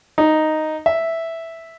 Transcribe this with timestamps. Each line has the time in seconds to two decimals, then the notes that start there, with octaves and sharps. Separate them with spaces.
0.18 D#4
0.86 E5